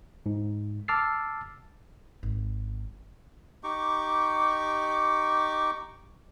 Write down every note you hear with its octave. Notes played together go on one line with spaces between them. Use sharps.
G#2
A5 D6 E6 F6 A6 C7
G#1
D#4 G4 C#6 D6